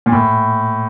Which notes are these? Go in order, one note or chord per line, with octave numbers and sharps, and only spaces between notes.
A#2
A2